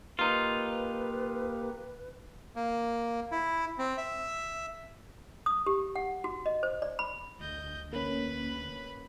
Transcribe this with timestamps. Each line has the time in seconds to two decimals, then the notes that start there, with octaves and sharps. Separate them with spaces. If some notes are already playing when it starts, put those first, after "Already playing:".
0.19 A#3 D#4 F4 G4 B4
2.56 A#3
3.32 E4
3.78 C4
3.97 E5
5.46 D#6
5.66 G4
5.96 F#5
6.24 F#4
6.46 D#5
6.63 C5
6.82 D5
6.99 B5
7.40 D2 D#5 G6
7.93 A#3 C#4 B4 B5